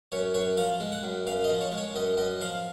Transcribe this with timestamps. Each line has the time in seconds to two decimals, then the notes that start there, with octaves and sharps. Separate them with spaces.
0.12 F#2 C#5
0.34 F#2 C#5
0.57 F3 F5
0.80 G#3
0.92 F#5
1.03 F#2
1.27 F#2 F5
1.44 D#5
1.49 F3
1.61 C#5
1.72 G#3
1.77 C#5
1.95 F#2 D#5
2.17 F#2 D#5
2.41 F3 F5